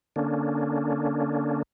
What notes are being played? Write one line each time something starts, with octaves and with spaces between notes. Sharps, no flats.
D3 A#3 C#4 D4